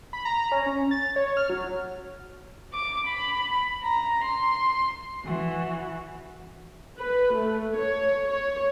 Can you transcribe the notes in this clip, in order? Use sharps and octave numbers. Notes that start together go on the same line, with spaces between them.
B5
A#5
C#4
C#4
A6
C#5
F6
F#3
D6
B5
A#5
C6
E3 F#4
B4
A3
C#5
C#5